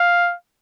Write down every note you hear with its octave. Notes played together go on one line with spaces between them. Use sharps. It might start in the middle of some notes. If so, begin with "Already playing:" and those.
Already playing: F5